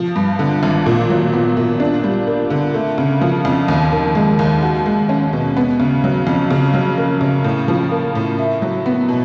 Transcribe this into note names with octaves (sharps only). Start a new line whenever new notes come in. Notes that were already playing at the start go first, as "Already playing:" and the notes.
Already playing: F3
G2
D3
G#1
A#2
F#3
B3
A#2
D4
G3
A#3
D3
A3
C#3
F3
F2
D#2
D#3
G#3
D#2
F#4
G#3
C#4
B2
B3
C#3
F#3
F2
C#3
F#3
A#3
C#3
A2
F3
A#3
A2
E4
F#3
B3
B2